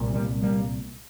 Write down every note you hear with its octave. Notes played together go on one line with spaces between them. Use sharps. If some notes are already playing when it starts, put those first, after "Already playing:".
Already playing: C2 A#2
G3 A#3
G3 A#3